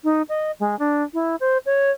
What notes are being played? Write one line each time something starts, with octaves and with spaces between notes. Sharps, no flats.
D#4
D#5
G#3
D4
E4
C5
C#5